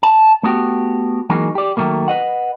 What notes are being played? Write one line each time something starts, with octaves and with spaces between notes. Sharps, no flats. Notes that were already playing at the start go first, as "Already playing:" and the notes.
A5
A3 B3 F#4 G4
E3 F#3 G#3 A#3 D#4
G4 D5
D#3 F3 F#3 A3 A#3
B4 D#5 F#5